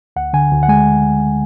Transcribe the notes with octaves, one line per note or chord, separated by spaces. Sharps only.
D2 F#5
D3 G#5
D2
F#5
G#3 G#5